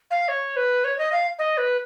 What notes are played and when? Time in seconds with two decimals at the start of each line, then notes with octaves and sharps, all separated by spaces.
0.11 F5
0.28 C#5
0.56 B4
0.84 C#5
0.98 D#5
1.12 F5
1.39 D#5
1.58 B4